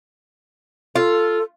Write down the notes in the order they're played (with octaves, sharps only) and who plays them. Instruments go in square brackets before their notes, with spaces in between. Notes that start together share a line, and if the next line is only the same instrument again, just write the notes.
[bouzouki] F4 [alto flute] A4